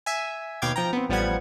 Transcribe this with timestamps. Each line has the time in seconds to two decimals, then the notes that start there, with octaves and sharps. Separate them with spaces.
0.06 E5 G#5
0.62 D#2 B2 F5 G5 D6 G#6
0.76 F3 G5 A#5
0.93 B3 C4
1.09 A1 F3 G3 B3 F#5 G#6